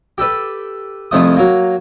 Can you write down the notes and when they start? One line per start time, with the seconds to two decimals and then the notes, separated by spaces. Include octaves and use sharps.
0.18 G4 A4 B4
1.11 C2 F2 F3 A3 D#6
1.37 F#3 A#3